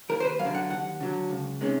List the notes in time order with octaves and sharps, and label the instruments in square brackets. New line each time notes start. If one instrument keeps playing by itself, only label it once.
[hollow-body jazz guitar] D#2 A#4
C5
B4
F#3 F5
D3
F#5
D#2 F#5
D3 F#3
C#2
C3 D#3 G#3 C#4